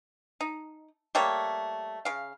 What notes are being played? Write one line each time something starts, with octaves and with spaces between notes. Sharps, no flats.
D#4
G3 A3 A#3 C#5
C#3 F5